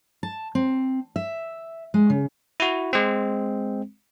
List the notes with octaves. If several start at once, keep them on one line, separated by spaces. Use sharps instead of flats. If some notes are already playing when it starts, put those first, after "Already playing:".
A5
C4
E5
G#3
C#3
E4 F#4
G#3 C4